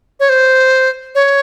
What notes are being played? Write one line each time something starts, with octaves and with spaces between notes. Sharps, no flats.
C#5
C5
C#5